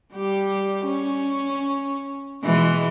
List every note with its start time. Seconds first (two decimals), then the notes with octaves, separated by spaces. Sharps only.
0.14 G3 G4
0.85 C#4
2.43 B2 E3 G#3